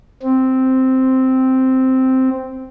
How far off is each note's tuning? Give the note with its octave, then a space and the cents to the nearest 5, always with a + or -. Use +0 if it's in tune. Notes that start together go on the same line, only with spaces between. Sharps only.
C4 -5